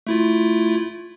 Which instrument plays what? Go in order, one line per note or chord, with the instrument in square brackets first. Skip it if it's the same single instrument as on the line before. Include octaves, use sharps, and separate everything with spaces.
[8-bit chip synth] A3 E4 F4